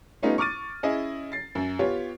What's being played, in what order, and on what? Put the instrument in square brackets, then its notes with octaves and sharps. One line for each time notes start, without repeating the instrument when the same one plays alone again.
[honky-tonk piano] G3 A3 B3 C#4 D#4 F4
C#6 D6 F6 A6 D#7
C#4 E4 G#4 D#5
A6 C7
F#2
B3 F4 G4 C#5